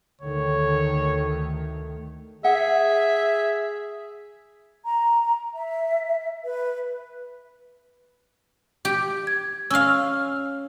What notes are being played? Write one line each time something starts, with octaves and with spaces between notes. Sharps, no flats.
D2 D3 D#3 A3 C#5
G#4 E5 F#5
A#5
E5
B4
G4
G#6
C#4 F5 E6 F6